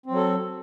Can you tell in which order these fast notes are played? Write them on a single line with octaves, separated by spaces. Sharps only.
C4 F#3 A4